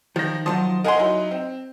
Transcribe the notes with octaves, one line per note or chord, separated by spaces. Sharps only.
D#3 F3 A#6
D#3 F3 F#3 A5 C6 D#6
A#4 D#5 F#5 G#5 C6
F#3 D#4 E4
C4